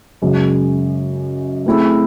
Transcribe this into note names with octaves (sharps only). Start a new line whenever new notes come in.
F#2 C#3 G#3
A3 C4 E4 G#4